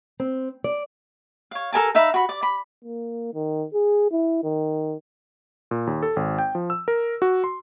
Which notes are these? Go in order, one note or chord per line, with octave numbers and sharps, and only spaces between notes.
C4
D5
C#5 F5
A4 A#4 G#5 A5
D#4 E5 F5 B5
F#4 B5
D5
B5
A#3
D#3
G#4
E4
D#3
A#2
D#2
A4
G#1
G5
F3
E6
A#4
F#4
C6